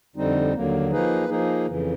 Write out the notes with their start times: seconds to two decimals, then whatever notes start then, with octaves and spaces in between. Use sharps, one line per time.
0.16 F2 D3 G3 C4 D#4
0.54 D#2 D3 F#3 A#3
0.91 F3 A#3 D#4 G#4 B4
1.29 F3 A#3 D#4 G#4
1.66 F2 C#3 E3